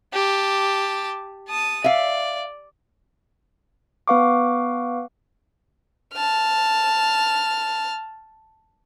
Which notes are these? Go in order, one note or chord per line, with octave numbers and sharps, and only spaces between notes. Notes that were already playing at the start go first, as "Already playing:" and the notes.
G4 A5
A5 D#6
D5 E5 F5
B3 B4 F5 C#6 D6
A5 F6